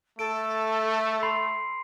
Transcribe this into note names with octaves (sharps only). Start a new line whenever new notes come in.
A3 A4 D7
B5 C6 C7